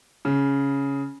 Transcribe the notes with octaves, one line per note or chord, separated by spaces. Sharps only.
C#3